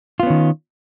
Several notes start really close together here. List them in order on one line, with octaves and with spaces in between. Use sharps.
F4 B3 C#4 D#3